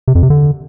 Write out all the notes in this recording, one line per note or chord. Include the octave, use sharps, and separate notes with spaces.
C3
F2
C3
D3